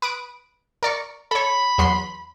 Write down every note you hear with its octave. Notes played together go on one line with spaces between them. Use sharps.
B4 D#6 D7
A#4 D5 C#6
A4 C#5 B5
E2 F#3 C6